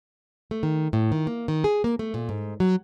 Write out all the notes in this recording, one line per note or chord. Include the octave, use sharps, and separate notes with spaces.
A3
D#3
A2
D#3
A#3
D#3
G#4
A#3
A3
A#2
G#2
F#3